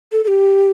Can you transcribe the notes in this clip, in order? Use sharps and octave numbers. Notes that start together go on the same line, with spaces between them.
A4
A4
G4